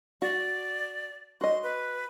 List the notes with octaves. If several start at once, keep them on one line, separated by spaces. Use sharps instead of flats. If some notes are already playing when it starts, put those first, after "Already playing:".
F#4 D5
F#4 D#5 C6
B4